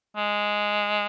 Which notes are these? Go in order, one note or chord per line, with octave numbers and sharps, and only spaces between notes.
G#3